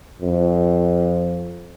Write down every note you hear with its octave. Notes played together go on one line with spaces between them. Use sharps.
F2